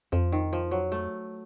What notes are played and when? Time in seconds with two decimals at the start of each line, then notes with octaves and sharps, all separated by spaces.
0.12 F2 F3
0.32 D#3
0.53 F3
0.71 F#3
0.92 A3